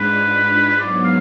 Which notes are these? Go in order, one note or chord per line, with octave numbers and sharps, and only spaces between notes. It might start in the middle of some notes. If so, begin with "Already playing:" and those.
Already playing: G#2 G#3 D4 F4 B4
G#2 F#3 B3 D5
F5